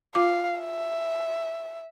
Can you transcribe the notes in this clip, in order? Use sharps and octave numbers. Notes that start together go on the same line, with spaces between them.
F4 F5 D6
E5